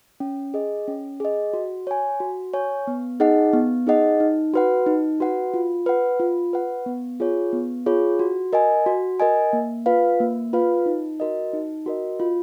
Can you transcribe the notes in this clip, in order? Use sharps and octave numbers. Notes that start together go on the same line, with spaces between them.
C#4
G#4 D#5
C#4
G#4 D#5
F#4
C#5 G#5
F#4
C#5 G#5
B3
D#4 G#4 D#5 F#5
B3
D#4 G#4 D#5 F#5
D#4
F#4 B4 F#5
D#4
F#4 B4 F#5
F4
B4 F#5
F4
B4 F#5
B3
F4 G#4 C#5
B3
F4 G#4 C#5
F#4
A#4 D#5 G#5
F#4
A#4 D#5 G#5
A#3
F4 B4 F5
A#3
F4 B4 F5
D#4
F#4 A#4 D#5
D#4
F#4 A#4 D#5
F4